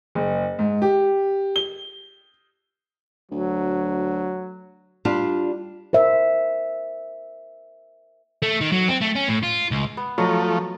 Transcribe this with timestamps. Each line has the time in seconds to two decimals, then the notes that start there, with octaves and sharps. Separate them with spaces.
0.15 F#1
0.59 G#2
0.82 G4
1.56 G7
3.32 D2 F#3
5.05 G3 D4 F4
5.93 A#4 C5 E5
8.43 A3
8.61 D#3
8.72 F#3
8.89 C4
9.02 A3
9.16 C#4
9.29 A2
9.43 F4
9.71 C#2
9.97 B3
10.18 F3 F#3 A3 D#5